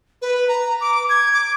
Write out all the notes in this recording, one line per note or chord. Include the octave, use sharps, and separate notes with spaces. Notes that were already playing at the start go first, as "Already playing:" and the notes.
B4
A#5
D6
G#6
D6